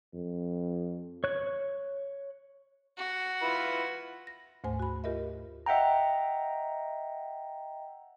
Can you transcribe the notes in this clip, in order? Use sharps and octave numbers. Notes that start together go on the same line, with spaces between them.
F2
C#5 F#6
F#4
E4 F4 B4
A#6
D2 G#2 A3 C5 G#5
F#4 B5
F4 G4 A#4 D#5 E5
D#5 E5 F#5 G5 A#5